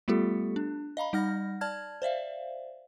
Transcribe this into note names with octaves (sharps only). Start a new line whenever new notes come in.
G3 A3 B3 F4 G4 A4
D4
D#5 F5 A#5 B5
G3 D#4 F#5 F6 A#6
D5 A5 F6 G#6
C5 D5 E5 F5